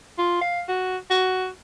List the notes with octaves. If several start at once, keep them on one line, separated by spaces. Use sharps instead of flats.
F4
F5
F#4
F#4